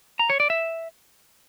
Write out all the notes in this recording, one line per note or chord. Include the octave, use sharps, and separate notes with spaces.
A#5
C#5
D5
E5